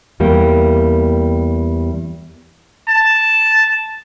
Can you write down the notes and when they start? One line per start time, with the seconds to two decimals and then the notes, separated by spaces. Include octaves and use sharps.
0.20 E2 G3 A#3
2.89 A5